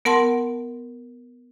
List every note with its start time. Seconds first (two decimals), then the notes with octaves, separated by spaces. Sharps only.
0.05 B3 A#4 F#5 A5 C6